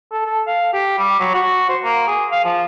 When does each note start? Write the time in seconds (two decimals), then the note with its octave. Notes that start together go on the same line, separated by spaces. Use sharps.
0.12 A4
0.26 A4
0.47 F5
0.73 G4
0.99 G3
1.20 F#3
1.34 F#4
1.69 C5
1.84 A#3
2.07 G#4
2.31 F5
2.45 F3